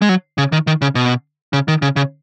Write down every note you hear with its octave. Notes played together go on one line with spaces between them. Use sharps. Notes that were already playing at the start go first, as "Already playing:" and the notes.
G#3
F#3
C#3
D#3
D#3
C#3
B2
C#3
D#3
C#3
C#3